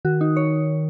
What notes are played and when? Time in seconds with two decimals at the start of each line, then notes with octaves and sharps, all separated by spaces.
0.05 D#3 F#4
0.21 D#4
0.36 C#5